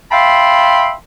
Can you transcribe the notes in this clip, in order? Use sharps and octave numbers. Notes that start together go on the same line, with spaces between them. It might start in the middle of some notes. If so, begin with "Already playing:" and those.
E5 F5 G5 A5 B5 C6